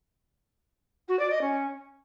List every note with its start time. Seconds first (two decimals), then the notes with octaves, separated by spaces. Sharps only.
1.08 F#4
1.19 D5
1.30 D#5
1.41 C#4